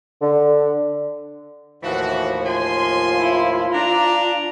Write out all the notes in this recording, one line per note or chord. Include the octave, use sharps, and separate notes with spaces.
D3
D#2 A2 E3 F3 F#4
F4 G#5 C6
E4
D4 A#5